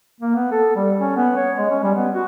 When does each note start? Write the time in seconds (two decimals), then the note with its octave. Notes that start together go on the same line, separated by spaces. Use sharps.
0.20 A#3
0.36 B3
0.52 A4
0.76 G3
1.00 C#4
1.17 B3
1.37 C#5
1.57 G#3
1.70 C#4
1.83 G3
1.95 B3
2.14 F#4